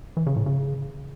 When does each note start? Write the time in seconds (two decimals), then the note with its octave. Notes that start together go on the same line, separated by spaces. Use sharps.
0.17 E3
0.27 C#3
0.36 A2
0.46 C#3